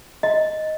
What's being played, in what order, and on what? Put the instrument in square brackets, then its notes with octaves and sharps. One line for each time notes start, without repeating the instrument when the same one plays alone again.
[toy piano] D#5